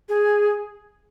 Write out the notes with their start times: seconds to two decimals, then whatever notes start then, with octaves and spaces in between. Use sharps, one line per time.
0.09 G#4